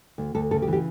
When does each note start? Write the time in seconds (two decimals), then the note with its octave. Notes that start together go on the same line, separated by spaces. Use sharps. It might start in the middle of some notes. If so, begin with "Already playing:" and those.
0.18 D2
0.35 D2 A4
0.51 C#3 A4
0.62 G4
0.68 E3
0.73 G4